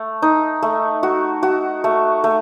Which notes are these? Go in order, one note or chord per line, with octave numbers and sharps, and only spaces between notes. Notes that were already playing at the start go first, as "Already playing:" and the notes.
Already playing: A3
D#4
A3
F#4
F#4
A3
A3